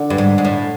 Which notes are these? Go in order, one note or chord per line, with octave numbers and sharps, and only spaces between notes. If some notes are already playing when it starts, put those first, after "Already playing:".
Already playing: D3
G2
G#2
G#2
A2